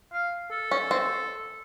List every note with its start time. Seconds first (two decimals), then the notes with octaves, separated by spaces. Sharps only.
0.13 F5
0.51 A4
0.71 C#4
0.91 C4